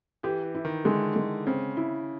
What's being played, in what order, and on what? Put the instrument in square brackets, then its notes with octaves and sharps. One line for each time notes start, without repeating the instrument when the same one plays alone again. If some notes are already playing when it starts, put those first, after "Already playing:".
[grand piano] E3 [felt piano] G4
[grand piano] E3
[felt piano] E4
[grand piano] D#3
[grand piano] D3 [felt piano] G#3
[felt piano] G#3
[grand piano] C#3 [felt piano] C4
[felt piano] E4